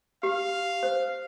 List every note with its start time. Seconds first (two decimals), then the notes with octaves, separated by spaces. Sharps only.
0.23 G4 F5
0.83 C5